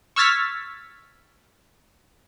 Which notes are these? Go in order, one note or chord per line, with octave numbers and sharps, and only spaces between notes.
C#6 E6 F6 G#6 A6 B6